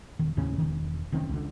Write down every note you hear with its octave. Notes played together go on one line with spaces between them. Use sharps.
E1 D#3
D#2 A2 C#3 C#4
E1 D#3
F1 D#3 C4 C#4
C#2 D3